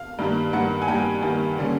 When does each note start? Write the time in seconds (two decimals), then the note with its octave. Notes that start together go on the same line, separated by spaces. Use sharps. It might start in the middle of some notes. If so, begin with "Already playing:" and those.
Already playing: F5
0.19 G2 D#3 G3 A#3
0.53 G2 D#3 G3 A#3 F#5
0.82 G#5
0.88 G2 D#3 G3 A#3 G5
1.23 G2 D#3 G3 A#3
1.58 D3 G3 A#3 C#4